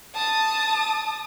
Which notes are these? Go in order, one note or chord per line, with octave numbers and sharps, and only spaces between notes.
A5 D#6